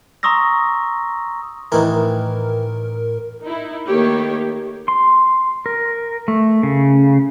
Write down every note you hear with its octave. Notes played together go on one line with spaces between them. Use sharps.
A#5 C6 C#6 D#6 E6 A#6
A2 D#3 E3 A#4
D#4 E4
D#3 A3 A#3 D#4 G4 C#5
C6
A#4
A3
C#3